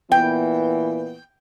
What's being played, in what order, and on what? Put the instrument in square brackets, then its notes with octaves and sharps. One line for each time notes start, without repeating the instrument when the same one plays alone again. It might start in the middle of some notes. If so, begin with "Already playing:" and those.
[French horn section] A#2 E3 B3 [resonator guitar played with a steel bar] G5